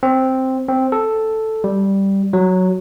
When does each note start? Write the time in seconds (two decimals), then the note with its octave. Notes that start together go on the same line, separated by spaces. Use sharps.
0.03 C4
0.68 C4
0.92 A4
1.64 G3
2.33 F#3